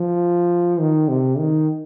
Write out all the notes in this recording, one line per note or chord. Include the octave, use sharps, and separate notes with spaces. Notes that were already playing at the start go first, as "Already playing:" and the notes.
Already playing: F3
D#3
C3
D#3